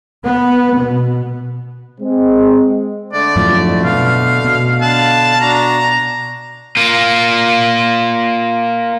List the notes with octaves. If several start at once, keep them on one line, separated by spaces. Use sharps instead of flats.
B3
B2
G#3 C4
D3 A3 D5
F#2 A2 F3
B2 F5
B2
D3 F5 A5 F#6
D4 F#4 A#5
A#3 F4